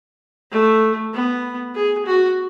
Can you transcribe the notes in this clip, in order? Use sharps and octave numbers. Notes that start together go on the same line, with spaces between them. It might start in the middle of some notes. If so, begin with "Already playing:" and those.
A3
B3
G#4
F#4